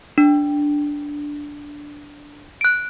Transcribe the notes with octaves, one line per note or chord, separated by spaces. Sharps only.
D4
F#6 D7